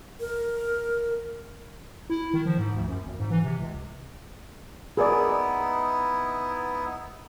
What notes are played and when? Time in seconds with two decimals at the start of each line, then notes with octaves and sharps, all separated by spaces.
0.20 A#4
2.10 E4
2.33 D#3
2.46 F3
2.58 G#2
2.75 D2
2.88 F#2
3.05 G#1
3.19 G#2
3.31 E3
3.44 C3
3.60 C#2
4.97 B3 D#4 E4 G#4 A#4 D5